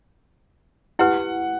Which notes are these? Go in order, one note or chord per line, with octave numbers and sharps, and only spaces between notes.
E4 G4 B4 F#5